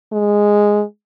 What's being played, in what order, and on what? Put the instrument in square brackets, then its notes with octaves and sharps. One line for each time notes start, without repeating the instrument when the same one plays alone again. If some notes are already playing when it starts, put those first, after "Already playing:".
[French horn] G#3